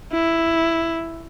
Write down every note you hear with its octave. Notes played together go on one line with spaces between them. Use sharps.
E4